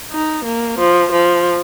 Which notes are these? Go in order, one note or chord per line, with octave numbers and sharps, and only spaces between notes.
D#4
A#3
F3
F3